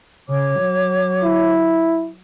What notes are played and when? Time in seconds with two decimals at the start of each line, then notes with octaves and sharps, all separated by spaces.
0.29 C#3 C#5 D6
0.60 F#3
1.23 E4